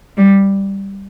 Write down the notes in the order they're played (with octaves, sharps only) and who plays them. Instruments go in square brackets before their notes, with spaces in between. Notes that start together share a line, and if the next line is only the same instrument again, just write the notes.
[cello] G3